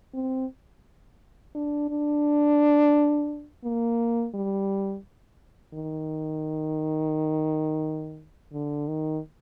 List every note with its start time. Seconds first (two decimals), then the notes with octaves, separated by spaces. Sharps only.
0.14 C4
1.55 D4
1.90 D4
3.64 A#3
4.34 G3
5.74 D#3
8.53 D3
8.88 D#3